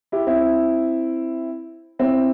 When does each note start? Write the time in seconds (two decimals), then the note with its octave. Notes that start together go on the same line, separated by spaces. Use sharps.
0.12 E4 G4
0.27 C4 E4
1.99 C4 E4